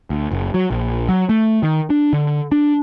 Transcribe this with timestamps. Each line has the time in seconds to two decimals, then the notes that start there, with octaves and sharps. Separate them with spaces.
0.10 D2
0.31 F#1
0.54 F#3
0.71 A#1
1.09 F#3
1.29 A3
1.63 D#3
1.90 D4
2.13 D3
2.52 D4